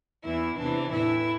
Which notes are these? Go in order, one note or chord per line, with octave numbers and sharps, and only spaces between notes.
E2 E3 E4
E2 C3 E3 D4
A2 E3 E4